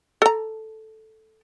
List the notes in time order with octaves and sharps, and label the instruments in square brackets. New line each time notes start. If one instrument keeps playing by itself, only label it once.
[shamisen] A4 A#5